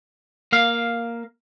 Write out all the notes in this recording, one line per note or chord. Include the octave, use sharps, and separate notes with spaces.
A#3 F5